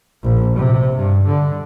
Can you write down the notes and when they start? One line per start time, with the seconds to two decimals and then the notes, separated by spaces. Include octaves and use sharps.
0.23 A#1
0.56 C3
0.95 G2
1.26 D3